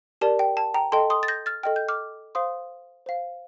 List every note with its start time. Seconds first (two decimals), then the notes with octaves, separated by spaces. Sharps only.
0.21 G4 A#4 D5 A5
0.39 G5
0.57 A5
0.74 G5 A#5
0.92 A4 D#5 G5 A5 C6
1.10 C6 D#6
1.23 A6
1.28 G6 A#6
1.46 F6 A6
1.63 A4 D#5 G5 F6
1.76 G6
1.88 D6 F6
2.35 C5 F5 C6 D#6
3.06 C5 F5